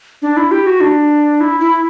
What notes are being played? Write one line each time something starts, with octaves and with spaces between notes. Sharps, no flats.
D4
E4
G4
F#4
D4
E4
E4